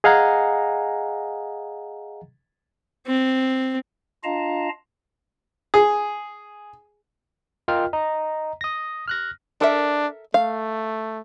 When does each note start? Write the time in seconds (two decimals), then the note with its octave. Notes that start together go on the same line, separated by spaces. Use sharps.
0.04 G#4 D#5 F5 F#5 G#5 A#5
3.07 C4
4.24 D4 F4 D#5 F5 A5 A#5
5.74 G#4
7.68 F4 A#4 D#5 G5 F6
7.93 D#5 A#5
8.61 D#6 A#6
9.08 F6 F#6 A#6
9.61 D4 A4 A#4 E5
10.34 A3 F5